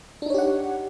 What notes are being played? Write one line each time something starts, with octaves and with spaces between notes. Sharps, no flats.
D4 D#4 G4 C#5 F#5